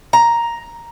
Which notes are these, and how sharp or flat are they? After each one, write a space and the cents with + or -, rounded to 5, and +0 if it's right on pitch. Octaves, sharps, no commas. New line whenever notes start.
A#5 +5